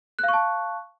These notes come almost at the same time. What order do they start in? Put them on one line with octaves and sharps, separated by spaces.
F#6 F5 C#6 A5